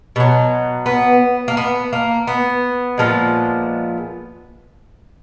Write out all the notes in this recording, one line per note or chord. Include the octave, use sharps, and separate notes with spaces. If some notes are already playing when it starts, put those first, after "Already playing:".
B2 F#3
B3
A#3
B3
A#3
B3
A#2 F3 G#3